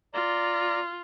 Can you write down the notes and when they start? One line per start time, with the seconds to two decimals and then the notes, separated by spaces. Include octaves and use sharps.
0.14 F4 D5 A#5